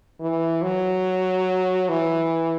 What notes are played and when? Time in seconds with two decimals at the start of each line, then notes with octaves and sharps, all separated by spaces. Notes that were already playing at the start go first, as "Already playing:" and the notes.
0.21 E3
0.63 F#3
1.89 E3